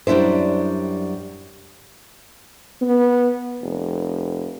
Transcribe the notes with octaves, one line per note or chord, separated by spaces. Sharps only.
F#2 G3 D4 E4 C5
B3
F1